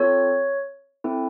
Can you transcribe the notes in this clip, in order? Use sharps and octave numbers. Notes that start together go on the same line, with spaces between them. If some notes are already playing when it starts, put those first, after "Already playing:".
Already playing: C4 F4 A4 C#5
C4 E4 A4